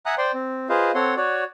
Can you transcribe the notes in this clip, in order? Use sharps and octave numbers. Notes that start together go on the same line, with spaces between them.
E5 F#5 G#5 A#5 D#6 F#6
C5 D5 G5 C6
C4
F4 G#4 B4 C5 D#5 F5
C4 A4 C#5 F#5 C6
F#4 C#5 D5